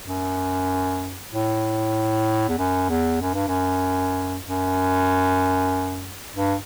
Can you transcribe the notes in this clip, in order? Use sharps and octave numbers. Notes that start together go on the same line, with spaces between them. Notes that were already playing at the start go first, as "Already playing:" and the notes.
F#2
A2
E2
F#2
E2
F#2
G2
F#2
F#2
G2